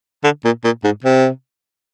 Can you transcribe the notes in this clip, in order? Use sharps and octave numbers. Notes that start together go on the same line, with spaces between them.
D3
A#2
A#2
G#2
C3